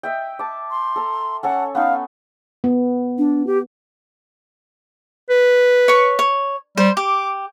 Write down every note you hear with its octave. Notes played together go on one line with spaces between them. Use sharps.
D#5 E5 G5
A5 D6
C6
A4 A#5
C#4 A4 C#5 F#5
B3 C#4 D#4 F5
B3
D4
G4
B4
C#5 C#6
C#5
G3 C5
G4 D6